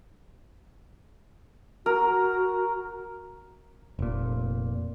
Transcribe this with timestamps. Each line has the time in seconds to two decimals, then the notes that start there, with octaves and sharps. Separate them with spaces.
1.86 F#4 A#4
3.99 F1 A#2